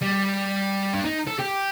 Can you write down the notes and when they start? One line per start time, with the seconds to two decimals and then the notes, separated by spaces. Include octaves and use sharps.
0.01 G3
0.93 D4
1.05 D#4
1.27 A4
1.39 G4